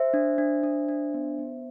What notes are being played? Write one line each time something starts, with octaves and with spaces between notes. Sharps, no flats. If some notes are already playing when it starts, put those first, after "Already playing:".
Already playing: C5 E5
D4
D4
D4
D4
B3
B3